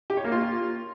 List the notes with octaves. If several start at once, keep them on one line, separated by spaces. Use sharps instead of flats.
G4
C#5
A#3
F4